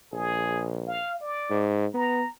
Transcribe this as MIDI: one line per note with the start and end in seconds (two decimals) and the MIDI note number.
0.13 1.00 34
0.13 0.66 68
0.88 1.16 77
1.21 1.65 74
1.50 1.86 44
1.94 2.23 59
1.94 2.30 82